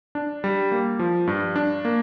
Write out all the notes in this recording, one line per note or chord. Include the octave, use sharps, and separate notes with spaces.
D4
G3
A#3
F3
G2
D4
A#3